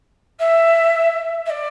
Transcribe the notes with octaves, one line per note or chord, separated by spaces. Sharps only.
E5
E5
D5